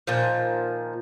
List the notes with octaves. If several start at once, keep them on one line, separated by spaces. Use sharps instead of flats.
A#2 D#3 F3